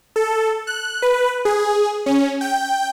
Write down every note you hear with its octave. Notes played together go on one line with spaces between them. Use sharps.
A4
F#6
B4
G#4
C#4
G5